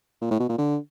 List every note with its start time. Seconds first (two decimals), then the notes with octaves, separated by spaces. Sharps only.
0.22 A#2
0.31 A2
0.40 B2
0.49 A#2
0.58 D3